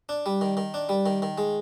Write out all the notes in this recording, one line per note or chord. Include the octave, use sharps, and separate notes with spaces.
D4
G3
D#3
D#3
D4
G3
D#3
D#3
G#3